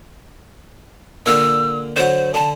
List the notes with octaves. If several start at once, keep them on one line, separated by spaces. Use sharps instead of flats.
A#2 D3 F5 E6
D3 F#3 C5 F#5
D3 A5